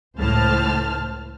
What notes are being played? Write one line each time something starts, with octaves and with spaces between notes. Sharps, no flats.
C#2 A2 C5 A5 F6